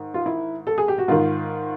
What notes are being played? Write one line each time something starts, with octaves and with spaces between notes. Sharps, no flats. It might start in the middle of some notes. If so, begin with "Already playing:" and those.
Already playing: G#2 D#3
F4
E4
A4
G#4
G4
F#4
G#2 D#3 F4